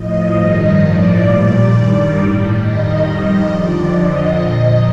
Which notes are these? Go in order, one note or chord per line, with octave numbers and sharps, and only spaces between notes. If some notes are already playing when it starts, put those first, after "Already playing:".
Already playing: A2 F3 D#5
G2 D#3 G3
A2 F3 D5
A#2 G3
G2 D#3 G3
A2 G3
F2 D#3 G3 D#5
F2 D#3 G3
F2 D3 F3 D5
F2 D3 F3 D#5
A#2 F3